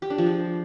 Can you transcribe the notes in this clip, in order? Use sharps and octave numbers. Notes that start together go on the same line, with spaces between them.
G4
D4
F3
G#3